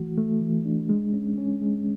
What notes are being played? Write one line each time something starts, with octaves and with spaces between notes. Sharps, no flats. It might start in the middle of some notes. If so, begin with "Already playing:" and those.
Already playing: E3 A3 F#4
A3
E3
D4
G#3
C#4
C#4
G#3